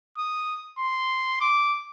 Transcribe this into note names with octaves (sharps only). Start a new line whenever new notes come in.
D#6
C6
D6